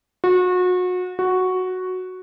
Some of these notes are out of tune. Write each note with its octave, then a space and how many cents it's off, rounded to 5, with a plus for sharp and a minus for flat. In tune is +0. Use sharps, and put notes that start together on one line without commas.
F#4 -30
F#4 +0